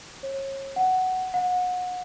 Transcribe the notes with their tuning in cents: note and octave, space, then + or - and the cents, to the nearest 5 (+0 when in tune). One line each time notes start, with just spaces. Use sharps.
C#5 -35
F#5 +10
F#5 -30